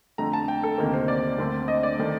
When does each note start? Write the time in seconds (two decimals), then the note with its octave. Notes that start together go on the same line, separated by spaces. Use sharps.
0.18 F2 D3 A3 A#5
0.33 A5
0.48 G5
0.63 A4
0.78 D2 C3 D#3 A#3 A#4
0.93 C5
1.08 D5
1.38 D2 D3 A3 C4
1.68 D#5
1.83 D5
1.98 D#3 A3